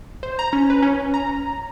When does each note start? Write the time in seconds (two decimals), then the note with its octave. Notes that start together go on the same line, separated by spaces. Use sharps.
0.23 C5
0.39 A#5
0.53 C#4
0.70 B4
0.82 C#4
1.14 A#5